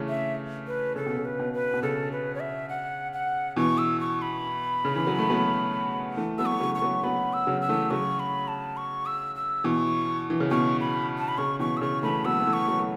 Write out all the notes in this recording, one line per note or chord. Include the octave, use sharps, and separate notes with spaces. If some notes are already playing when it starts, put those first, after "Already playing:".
Already playing: C#3 E3 A3
E5
B4
C#3 A4
B2
C#3
B4
B2
B4
B2
C#3 A4
B4
C#5
E5
F#5
F#5
B2 E3 C#6
E6
C#6
B5
C#3
E3
F#3
A3
F#3 B3
E3 A3
F#3 B3 E6
C#6
A3
C#3 F#3
C#6
F#3 B3
F#3 B3 B5
E6
C#3 F#3
E6
E3 A3
C#3 F#3 C#6
B5
A5
C#6
E6
E6
B2 E3 C#6
E3
C#3
B2 C#6
B5
A5
B5
C#3 C#6
B2 E3 C#6
E6
C#3 C#6
E3 A3 B5
F#3 B3 E6
B3
E3 A3
C#6
F#3 B3
A3